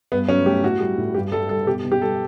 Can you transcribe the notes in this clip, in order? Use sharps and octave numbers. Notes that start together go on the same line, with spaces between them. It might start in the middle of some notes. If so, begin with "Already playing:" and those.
G2 B3
F#3 C#4
A3 G4
A2 F#4
G3
A2
G2 G4
G3 A4
G2 A4
B2 G4
B2
G4
G3 A4